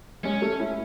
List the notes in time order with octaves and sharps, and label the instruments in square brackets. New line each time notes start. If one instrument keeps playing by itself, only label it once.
[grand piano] G#3 [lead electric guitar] C#4
[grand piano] A3
E4